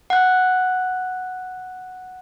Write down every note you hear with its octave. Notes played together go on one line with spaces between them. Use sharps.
F#5 F#6